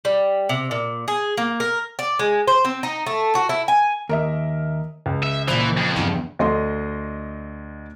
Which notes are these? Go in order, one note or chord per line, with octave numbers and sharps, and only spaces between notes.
G3
C3
A#2
G#4
A#3
A#4
D5
G#3
C5
C4
D#4
A3
F#4
E4
G#5
D#2 A#4 D#5 E5
C#2
E5
A#2 E3 C5
F2
E2 G2
D2 D#5 C6